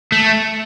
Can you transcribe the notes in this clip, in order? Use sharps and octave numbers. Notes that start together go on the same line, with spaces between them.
A3